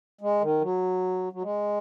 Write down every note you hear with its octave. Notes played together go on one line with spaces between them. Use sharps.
G#3
D#3
F#3
F#3
G#3